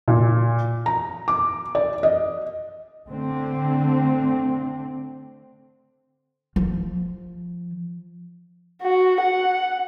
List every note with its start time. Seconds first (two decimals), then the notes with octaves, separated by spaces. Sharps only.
0.08 A#2
0.86 A#5
1.28 D6
1.75 D5
2.03 D#5
3.08 D3 A3 C4
6.56 F3
8.83 F#4
9.20 F#5